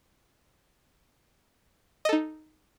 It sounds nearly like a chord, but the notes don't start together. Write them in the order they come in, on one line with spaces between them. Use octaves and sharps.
D#5 A4 D#4